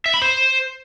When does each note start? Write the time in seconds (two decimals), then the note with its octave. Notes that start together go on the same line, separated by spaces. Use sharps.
0.06 E5
0.14 B5
0.22 C5